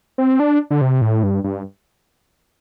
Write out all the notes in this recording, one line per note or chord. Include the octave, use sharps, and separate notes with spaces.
C4
D4
D3
C3
A2
G2
G2